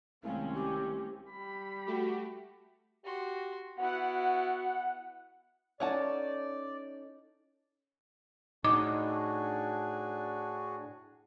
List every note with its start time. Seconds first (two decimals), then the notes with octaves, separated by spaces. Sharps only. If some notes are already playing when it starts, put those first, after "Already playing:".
0.24 C2 D#3 G#3 A3 C4 C#4 F5
0.55 G4
1.30 G3 B5
1.86 A3 F#4 G4
3.05 F#4 G4 C6
3.78 B3 E4 F#4 F#5
5.80 C#4 D#4 A4 C#5 D5 F#5 A5
8.64 A2 D4 D#4 F#4 G#4 D6